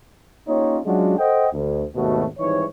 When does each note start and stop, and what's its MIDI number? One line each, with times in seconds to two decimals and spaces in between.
0.48 0.79 58
0.48 0.79 61
0.48 0.79 63
0.48 0.79 65
0.48 0.79 67
0.48 0.79 73
0.86 1.17 54
0.86 1.17 56
0.86 1.17 61
0.86 1.17 62
0.86 1.17 65
0.86 1.17 66
1.19 1.47 69
1.19 1.47 72
1.19 1.47 75
1.19 1.47 78
1.19 1.47 79
1.52 1.86 38
1.96 2.25 32
1.96 2.25 39
1.96 2.25 47
1.96 2.25 57
1.96 2.25 66
2.39 2.64 32
2.39 2.64 44
2.39 2.64 52
2.39 2.64 55
2.39 2.64 63
2.39 2.64 73